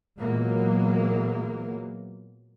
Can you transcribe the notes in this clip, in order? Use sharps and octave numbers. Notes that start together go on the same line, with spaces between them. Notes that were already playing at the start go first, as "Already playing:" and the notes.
A#2 E3 F#3 G#3 A#3 B3